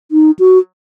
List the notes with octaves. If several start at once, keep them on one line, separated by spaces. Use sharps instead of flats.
D#4
F#4